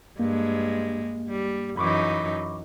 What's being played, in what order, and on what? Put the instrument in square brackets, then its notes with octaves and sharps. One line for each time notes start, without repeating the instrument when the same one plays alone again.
[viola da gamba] G2 G#3 [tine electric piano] A#3
[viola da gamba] G3
[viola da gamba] F#2 E3 D#4 [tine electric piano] B5 C#6 D6